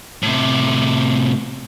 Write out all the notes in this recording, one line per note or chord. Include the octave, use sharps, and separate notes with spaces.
A2 C3